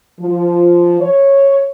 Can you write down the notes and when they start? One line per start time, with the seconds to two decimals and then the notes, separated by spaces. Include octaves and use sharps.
0.20 F3
1.01 C#5